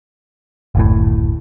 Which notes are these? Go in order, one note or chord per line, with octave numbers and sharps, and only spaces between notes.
F#1 D2 A2